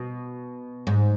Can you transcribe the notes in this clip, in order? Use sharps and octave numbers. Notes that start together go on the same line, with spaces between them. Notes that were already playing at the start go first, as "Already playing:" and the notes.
Already playing: B2
G#2